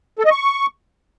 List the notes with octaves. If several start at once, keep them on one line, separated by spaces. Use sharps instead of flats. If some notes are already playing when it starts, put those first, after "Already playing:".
A4
D#5
C#6